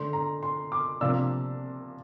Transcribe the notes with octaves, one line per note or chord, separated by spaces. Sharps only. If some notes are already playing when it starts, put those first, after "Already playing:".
Already playing: D3 A3 D4 C6
A#5
C6
D6
C3 F3 A#3 D4 E6